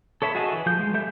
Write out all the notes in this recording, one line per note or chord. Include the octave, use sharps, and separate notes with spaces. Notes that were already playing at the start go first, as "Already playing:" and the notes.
A4 C#5 E5 A5 B5
F#4 G#4 D#5 E5 A5
E3
F3 G6
G#3
G3 A4 E5 G6